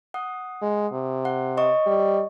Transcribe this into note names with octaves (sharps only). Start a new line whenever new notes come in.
F#5 D#6
G#3
C3
F#5
C#5 D#5 C#6
G3